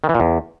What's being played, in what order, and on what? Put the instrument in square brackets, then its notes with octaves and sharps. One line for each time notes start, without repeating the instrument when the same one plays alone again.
[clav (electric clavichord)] D#3
E3
A#2
E2